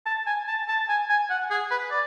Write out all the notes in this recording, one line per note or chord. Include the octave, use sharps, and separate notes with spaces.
A5
G#5
A5
A5
G#5
G#5
F#5
G#4
B4
D5